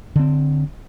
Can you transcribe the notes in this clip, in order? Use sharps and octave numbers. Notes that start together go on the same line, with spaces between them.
D3 C4